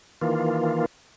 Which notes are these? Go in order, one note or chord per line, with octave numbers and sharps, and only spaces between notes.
D#3 E3 A#3 F4